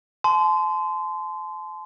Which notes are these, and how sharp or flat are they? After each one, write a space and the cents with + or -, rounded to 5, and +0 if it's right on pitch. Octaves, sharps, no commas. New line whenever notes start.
A5 -40 C6 -20